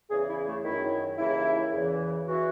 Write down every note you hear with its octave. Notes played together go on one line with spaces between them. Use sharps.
E2 C#3 E3 G#4
E4
A3
F#2 D#3 E4
D#2 C#3 E3 E4
E2 C#3 E3
E3 F#4